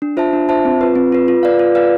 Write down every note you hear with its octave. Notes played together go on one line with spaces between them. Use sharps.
D4
F4 C5 E5 A5
D4
F4 C5 E5 A5
C4
F4 B4
C4
F4 B4
F4
B4 D5 F5
F4
B4 D5 F5